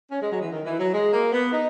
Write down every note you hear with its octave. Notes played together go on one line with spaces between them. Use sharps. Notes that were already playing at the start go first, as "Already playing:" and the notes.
C#4
G#3
F#3
E3
D#3
E3
F#3
G#3
A#3
B3
D#4